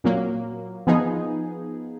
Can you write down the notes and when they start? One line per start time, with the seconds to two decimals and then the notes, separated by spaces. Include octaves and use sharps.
0.04 A#2 F#3 A#3
0.87 F3 B3 D#4 G#4